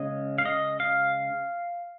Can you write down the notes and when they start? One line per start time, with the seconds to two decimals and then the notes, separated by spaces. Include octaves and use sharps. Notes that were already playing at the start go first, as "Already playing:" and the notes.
Already playing: C#3 G#3 C#4 D#5
0.38 F5
0.45 D#5
0.80 F5